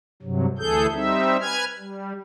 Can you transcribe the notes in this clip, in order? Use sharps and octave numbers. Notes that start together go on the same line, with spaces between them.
G2 C3 F#3
D2 E3 G#4 A4 G6
G3 C4 D#4 E5
B4 G#5 F6 G#6
G3